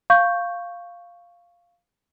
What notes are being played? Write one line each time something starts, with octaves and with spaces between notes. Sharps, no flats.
F5 C#6 G6